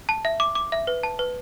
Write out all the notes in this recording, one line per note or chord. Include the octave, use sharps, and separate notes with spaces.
A5
E5
D6
D6
E5
B4
A5
B4